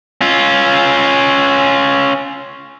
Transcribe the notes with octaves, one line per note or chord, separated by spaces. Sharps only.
C#4 F4